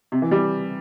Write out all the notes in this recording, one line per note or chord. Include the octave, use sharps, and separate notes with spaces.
C3
E3
G3